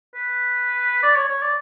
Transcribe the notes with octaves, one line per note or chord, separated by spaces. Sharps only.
B4
D5
C#5
C#5
D5